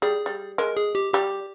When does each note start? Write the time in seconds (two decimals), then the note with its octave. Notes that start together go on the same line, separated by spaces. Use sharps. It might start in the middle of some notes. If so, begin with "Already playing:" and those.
0.02 G3 G#4
0.26 G3
0.58 G#3 A#4
0.77 G#4
0.95 G4
1.14 G3 G4